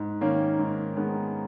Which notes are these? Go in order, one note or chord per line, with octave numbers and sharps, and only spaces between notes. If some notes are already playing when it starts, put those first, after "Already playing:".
Already playing: G#2
D#3 A#3 C#4
G#2
D#3 G#3 B3